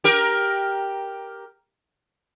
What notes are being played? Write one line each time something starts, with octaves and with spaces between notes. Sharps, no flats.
G4 A#4